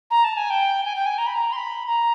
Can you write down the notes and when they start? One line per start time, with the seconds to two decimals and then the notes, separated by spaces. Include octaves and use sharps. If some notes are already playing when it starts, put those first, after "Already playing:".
0.11 A#5
0.24 A5
0.37 G#5
0.50 G5
0.85 G#5
0.96 G5
1.06 G#5
1.18 A#5
1.26 B5
1.34 A#5
1.52 C6
1.57 B5
1.87 A#5